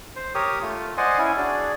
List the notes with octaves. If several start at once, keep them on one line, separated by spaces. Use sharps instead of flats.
C5
G4 A#4 C#5 D#6
A3 F4
C5 D5 D#5 F#5 G#5 C6
C#4 E4 G#5
D4 F#4 G#4 D5